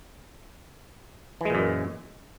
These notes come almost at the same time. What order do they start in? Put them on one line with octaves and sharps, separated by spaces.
E3 G#3 A#2 F#2